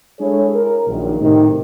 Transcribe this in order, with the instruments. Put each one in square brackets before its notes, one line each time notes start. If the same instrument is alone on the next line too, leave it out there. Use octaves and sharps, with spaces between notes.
[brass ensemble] G#3 D4 E4 G#4 A4 C#5
A#4
A#1 F#2 A#2 D#3
A2 C3 D#3